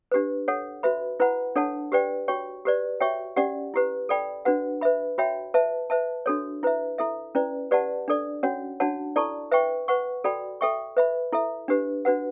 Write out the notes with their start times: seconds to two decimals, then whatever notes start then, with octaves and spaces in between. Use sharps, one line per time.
0.12 D4 G4 B4
0.48 A4 C#5 F#5
0.83 F#4 B4 E5 B5
1.20 E4 B4 F#5 B5
1.56 D4 A4 C#5 F#5 A5
1.92 G4 B4 D5 G5
2.28 F#4 C#5 G5 C#6
2.65 G4 B4 D5
3.00 F#4 C#5 E5 G5 C#6
3.36 C#4 G4 D5 F#5
3.74 E4 G4 B4
4.09 A4 D5 G5 B5
4.45 D4 F#4 B4 F#5
4.81 B4 E5 B5
5.18 F#4 C#5 E5 G5 B5
5.54 B4 E5 A5
5.90 B4 E5 A5
6.26 D4 F#4 A4 C#5
6.63 E4 B4 E5
6.98 E4 A4 E5
7.35 C#4 E4 B4 D5
7.71 G4 B4 D5 F#5 A5
8.08 D4 A4 D5
8.43 C#4 F#4 C#5 F#5
8.80 D4 F#4 C#5 F#5 A5
9.16 E4 A4 D5 A5 C#6
9.52 B4 E5 G5 C#6
9.88 B4 F#5 C#6
10.24 F#4 A4 D5 G5 B5
10.61 A4 E5 G5 C#6
10.97 B4 E5 B5
11.32 E4 A4 E5
11.68 D4 G4 B4
12.05 D4 F#4 B4 F#5